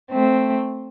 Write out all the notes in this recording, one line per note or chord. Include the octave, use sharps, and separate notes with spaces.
A3 C4